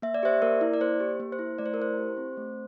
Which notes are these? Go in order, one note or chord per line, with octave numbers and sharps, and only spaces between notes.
A#3 E5
D5
G4 C5 E5
A#3 A#4 D5
E4
D5
A#3 C5
G4
A#3
C5
E4
A3 D5
C5
A#4
E4 C5
G4
C4
A3